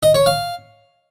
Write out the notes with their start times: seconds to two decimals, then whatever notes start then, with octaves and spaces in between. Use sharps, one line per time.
0.03 D#5
0.14 C#5
0.26 F5